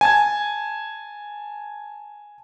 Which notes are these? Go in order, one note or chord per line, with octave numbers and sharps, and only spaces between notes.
G#5 A5 G#6